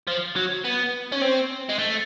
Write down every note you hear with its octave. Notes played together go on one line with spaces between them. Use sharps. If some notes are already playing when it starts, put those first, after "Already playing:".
F3
F#3
B3
C#4
C4
G#3
A3